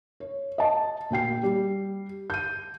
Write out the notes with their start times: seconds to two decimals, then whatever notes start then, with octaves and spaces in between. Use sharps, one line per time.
0.20 C#5
0.58 D#5 A5
1.10 A#2 F#4 G5 C7
1.43 G3
2.30 G6 D#7